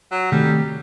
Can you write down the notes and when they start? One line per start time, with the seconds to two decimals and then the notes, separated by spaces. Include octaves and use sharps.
0.11 F#3
0.32 C3 D#3 G3 A3